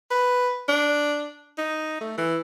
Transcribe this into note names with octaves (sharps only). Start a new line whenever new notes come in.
B4
D4
D#4
A3
E3